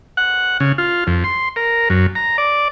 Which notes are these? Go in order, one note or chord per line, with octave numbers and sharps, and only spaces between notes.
F#5
C#3
F4
F2
C6
A#4
F#2
A#5
D5